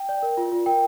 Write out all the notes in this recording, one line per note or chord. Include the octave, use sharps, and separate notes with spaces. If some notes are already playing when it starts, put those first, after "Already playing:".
Already playing: G5
D5
A#4
F4
F4
A#4 G5